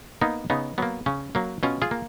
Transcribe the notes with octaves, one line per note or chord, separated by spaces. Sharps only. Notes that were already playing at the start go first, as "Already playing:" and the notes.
A#3 B3 D#4
C#3 B3 D#4
F#3 A#3 B3
C#3 C#4
F#3 A#3
B2 C#4 F4
F4 G#4
A#3